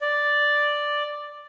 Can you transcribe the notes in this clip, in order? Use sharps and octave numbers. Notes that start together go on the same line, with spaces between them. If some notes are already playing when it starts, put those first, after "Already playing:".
D5